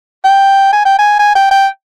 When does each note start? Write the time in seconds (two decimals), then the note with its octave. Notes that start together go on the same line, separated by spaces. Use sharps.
0.25 G5
0.73 G#5
0.86 G5
0.99 G#5
1.19 G#5
1.36 G5
1.51 G5